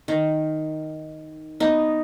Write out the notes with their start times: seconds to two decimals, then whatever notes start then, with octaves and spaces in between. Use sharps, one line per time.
0.08 D#3
1.60 B3 D#4